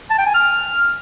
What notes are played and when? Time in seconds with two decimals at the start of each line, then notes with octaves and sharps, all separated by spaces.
0.10 A5
0.18 G5
0.26 G#5
0.34 F6